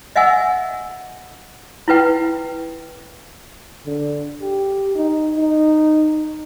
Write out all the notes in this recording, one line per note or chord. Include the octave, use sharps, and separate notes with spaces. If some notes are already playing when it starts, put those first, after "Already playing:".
D#5 E5 F#5 G#5 E6
E4 F4 B4 G5
D3
G4
D#4
D#4